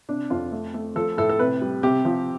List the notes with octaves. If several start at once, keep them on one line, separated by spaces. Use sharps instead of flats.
C3 D4
F2 F4
A3
A3
F3 A4
A2 A4
A4
C3 B4
G3
C3 G4
F3